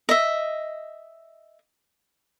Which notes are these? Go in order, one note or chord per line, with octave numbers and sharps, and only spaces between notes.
D#5 E5